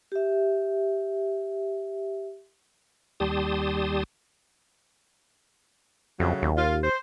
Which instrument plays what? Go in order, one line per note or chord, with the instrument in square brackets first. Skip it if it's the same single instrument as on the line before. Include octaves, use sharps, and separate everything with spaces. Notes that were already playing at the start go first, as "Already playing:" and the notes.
[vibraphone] G4 E5
[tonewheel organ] D#2 G3 G4 A5 C6 D#6
[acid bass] F2 [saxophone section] A2 C#3 F#3
[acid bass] D#2
[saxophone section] F4
C5